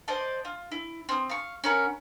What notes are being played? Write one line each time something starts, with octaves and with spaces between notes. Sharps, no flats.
C5 D5 D#5 A5
F4
E4
C4 D#6
F5 C#6
C#4 F#4 A#4 B5